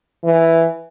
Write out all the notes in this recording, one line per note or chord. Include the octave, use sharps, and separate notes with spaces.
E3